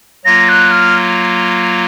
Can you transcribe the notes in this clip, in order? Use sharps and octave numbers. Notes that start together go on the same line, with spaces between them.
F#3 A#3 F4 A#6
F#6
F6